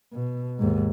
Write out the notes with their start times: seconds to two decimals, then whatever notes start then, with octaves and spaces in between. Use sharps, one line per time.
0.13 B2
0.59 D#2 G#2